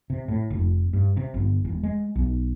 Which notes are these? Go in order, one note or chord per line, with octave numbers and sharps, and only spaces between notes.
C3
A2
F1
G2
C3
G1
E1
G#3
B1